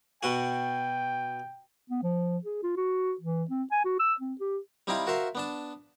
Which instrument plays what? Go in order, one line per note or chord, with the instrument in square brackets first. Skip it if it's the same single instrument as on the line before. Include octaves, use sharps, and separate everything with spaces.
[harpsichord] B2 F#4 [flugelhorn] G5
[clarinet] B3
F3
G#4
F4
F#4
E3
C4
G#5
F#4
E6
C4
G4
[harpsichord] G3 C4 D#4 E4 F5 G5
F#4 A#4 C5 E5 F5 C6
B3 D4 A5